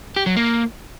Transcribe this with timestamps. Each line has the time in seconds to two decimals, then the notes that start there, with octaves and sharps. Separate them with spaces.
0.16 G4
0.26 F#3
0.36 A#3